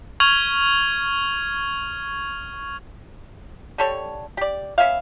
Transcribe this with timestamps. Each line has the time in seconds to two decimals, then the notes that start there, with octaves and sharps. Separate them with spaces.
0.20 C#6 F6 G#6 F7 F#7
3.78 D3 G4 A4 C#5
4.37 G4 D5
4.78 B3 C#4 E5 F5